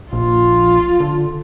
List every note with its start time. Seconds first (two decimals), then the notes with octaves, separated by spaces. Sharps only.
0.13 A#1 F4
1.00 D3